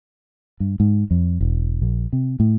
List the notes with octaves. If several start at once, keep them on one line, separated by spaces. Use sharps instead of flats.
G2
G#2
F2
E1
A#1
C3
A2